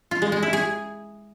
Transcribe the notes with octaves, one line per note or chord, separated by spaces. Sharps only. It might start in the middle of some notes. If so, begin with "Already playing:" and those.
F4
G#3
G#3
E4
G#4